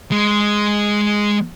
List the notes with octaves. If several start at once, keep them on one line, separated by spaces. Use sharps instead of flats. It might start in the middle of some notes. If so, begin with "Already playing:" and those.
G#3